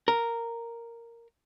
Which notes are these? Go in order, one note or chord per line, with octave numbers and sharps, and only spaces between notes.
A#4